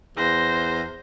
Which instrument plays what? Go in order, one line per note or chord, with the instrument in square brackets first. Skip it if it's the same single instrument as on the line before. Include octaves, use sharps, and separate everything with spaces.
[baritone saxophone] E2 [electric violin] C5 A#6